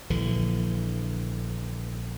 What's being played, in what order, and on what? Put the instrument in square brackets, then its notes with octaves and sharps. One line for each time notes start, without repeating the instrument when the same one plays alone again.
[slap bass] A#1 D3 E3